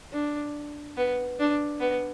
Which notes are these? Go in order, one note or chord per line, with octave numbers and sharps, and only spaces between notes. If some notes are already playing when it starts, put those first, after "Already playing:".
D4
B3
D4
B3